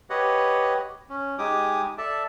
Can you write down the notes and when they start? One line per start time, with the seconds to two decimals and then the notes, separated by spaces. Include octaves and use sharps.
0.10 G4 B4 C#5 D#5 F#5
1.09 C#4
1.38 G#3 D#4 G4 G#5 D6 D#6
1.98 A4 D5 E5 A5